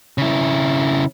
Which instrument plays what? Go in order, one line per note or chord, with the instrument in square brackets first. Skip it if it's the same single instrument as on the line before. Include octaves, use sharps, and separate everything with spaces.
[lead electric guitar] C#3 E4